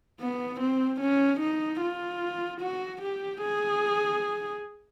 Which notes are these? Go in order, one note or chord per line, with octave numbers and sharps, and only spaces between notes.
B3
C4
C#4
D#4
F4
F#4
G4
G#4